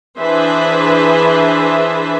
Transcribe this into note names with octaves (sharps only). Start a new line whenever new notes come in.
E3 D4 G#4 B4 C5 E5